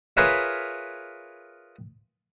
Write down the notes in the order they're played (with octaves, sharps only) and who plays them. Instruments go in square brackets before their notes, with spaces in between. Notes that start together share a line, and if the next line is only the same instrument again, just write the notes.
[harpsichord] F4 G#4 A#4 B4 C#5 E5